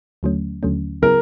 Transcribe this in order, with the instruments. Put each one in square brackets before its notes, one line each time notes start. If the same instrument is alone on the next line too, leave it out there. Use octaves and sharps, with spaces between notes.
[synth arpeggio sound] D#2 D3 F#3 A3 C#4
D#2 D3 F#3 A3 C#4
[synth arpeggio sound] C#3 F#3 B3 E4 G#4 [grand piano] A#4